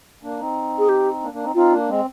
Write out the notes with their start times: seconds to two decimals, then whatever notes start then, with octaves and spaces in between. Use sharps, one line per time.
0.23 A#3 D4
0.39 C4 D#4
0.78 G#4
0.89 G4
1.22 A#3 D4
1.33 A#3 D4
1.44 C4 D#4
1.55 C4 D#4 F4
1.72 A#3 D4
1.89 G#3 C4